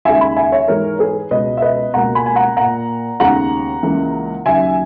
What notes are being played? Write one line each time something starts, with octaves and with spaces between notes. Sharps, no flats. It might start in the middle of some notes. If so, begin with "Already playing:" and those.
D#2 C#3 G#3 E5 G#5
G#5 B5
E5 G#5
C#5 E5
G#2 E3 G#3 A#4 C#5
G#4 B4
C#2 B2 G#3 B3 B4 D#5
E5
B4 D#5
C#2 B2 A#3 F#5 A#5
G#5 B5
G#5
F#5 A#5
A#2 A#3 F#5 A#5
D#2 C#3 G#3 B3 F#5 A#5
C#2 C#3 E3 A#3
D#2 C#3 F#3 E5 G#5